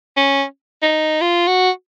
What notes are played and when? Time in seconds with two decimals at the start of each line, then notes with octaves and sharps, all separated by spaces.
0.17 C#4
0.82 D#4
1.21 F4
1.48 F#4